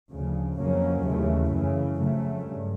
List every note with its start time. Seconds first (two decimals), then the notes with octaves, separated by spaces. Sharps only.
0.11 D2 C#3 F3
0.58 F2 C#3 F#3 A#3 C#4
1.05 D#2 C#3 E3 A3
1.52 F#2 C#3 E3
1.98 F2 C#3 F#3 A3
2.46 G2